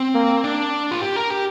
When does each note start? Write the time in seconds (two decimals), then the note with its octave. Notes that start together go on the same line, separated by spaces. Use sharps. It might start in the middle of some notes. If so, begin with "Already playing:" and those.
Already playing: C4
0.14 A#3
0.44 D4
0.91 F4
1.02 G4
1.16 A#4
1.30 G4